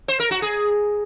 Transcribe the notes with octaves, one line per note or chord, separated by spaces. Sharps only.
C5
A#4
F#4
G#4